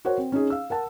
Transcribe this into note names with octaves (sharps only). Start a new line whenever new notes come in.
F#4 A#4 C5 C#5 F#5
C4
C#4 D#4 G#4
F5 E6
A#4 F#5 A5